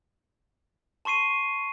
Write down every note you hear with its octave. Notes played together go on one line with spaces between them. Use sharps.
A5 C6 C#6 C7 D#7